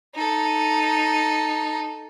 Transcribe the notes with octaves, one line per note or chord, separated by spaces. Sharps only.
D#4 A4